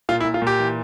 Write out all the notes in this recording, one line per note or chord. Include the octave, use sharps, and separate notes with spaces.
A#2 F4
E4
A#2
F4
A#2 G4
E3